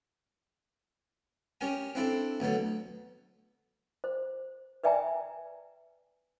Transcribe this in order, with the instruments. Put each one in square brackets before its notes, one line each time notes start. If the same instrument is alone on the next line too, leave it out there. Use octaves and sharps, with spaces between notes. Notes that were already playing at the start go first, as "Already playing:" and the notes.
[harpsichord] C#4 G4 A#4 G#5
C4 D4 E4 A4
D2 B2 F#3 A4
[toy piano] C5
B4 D5 E5 G5 G#5 A#5